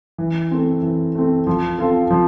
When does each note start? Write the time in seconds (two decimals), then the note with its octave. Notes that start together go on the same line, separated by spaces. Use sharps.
0.18 E3
0.51 A3 C4
0.83 E3
1.15 A3 C4
1.47 F3
1.78 C4 F4 A4
2.11 F3